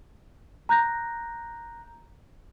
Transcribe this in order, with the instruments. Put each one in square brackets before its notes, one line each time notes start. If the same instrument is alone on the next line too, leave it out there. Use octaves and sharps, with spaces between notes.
[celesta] A#5 F#6 G6 A#6